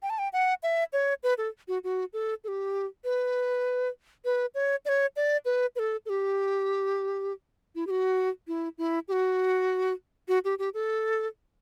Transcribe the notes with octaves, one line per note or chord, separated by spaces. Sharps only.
G5
A5
G5
F#5
E5
C#5
B4
A4
F#4
F#4
A4
A4
G4
B4
B4
C#5
D5
C#5
D5
B4
B4
A4
A4
G4
E4
G4
F#4
E4
E4
G4
F#4
F#4
G4
G4
A4